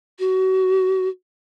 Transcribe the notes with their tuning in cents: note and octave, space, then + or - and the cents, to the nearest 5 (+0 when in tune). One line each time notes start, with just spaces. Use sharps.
F#4 +30